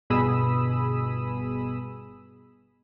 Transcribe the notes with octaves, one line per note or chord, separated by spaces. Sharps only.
G1 B2 G#4 B5 D#6 E6